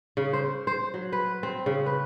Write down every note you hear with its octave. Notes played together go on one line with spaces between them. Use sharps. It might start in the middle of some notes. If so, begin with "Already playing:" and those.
C#3
C5
C5
F#3
B4
C4
C#3
B4